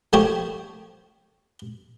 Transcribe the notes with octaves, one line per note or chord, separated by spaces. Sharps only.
F3 A3 C4 G4 C#5